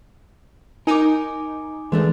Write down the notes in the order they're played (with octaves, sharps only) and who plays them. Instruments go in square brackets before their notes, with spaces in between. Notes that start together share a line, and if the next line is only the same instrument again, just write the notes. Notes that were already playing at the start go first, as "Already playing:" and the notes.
[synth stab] D#4 [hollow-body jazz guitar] A#4 [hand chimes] G#5 D6
[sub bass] E3 [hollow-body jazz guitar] G#3 A3 D4